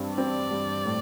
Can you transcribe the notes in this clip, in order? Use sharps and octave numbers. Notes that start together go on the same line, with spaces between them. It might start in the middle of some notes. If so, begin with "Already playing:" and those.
Already playing: G2 C4
C4 D5
G3
A2